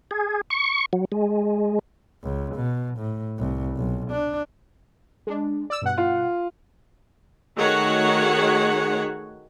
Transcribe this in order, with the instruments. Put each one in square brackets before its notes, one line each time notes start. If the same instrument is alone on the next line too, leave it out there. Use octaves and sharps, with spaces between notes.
[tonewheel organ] G#4
C#6
F#3
G#3
[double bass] C#2
B2
A2
C2
B1
D4
[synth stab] G#3 D4
D5 E6
G2 B2 F#5
[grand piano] F4
[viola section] D#3 A3 F#4 G#4 C#5 F#5